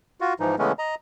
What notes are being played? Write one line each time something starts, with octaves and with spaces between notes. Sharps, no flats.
F4 F#4
G#2 E3 F3 D#4
C#3 E3 G#3 A3 B3 C#4
D#5 A#5